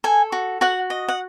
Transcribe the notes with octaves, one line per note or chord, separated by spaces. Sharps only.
A4 G#5
F#4
F#4 F#5
D#5
F#5